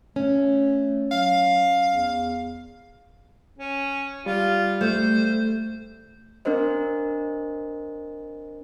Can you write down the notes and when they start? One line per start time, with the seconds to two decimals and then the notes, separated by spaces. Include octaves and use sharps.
0.16 A3 C#4
1.11 F#3 F5
1.90 E2
3.58 C#4
4.26 G3 F4
4.81 A3 C5
6.45 C4 D4 A#4 C5 D#5